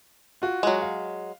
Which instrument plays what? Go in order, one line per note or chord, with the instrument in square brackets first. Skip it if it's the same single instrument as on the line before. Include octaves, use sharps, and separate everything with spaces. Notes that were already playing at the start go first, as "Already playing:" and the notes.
[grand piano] F4 F#4
[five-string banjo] F#3 G#3
[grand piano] F5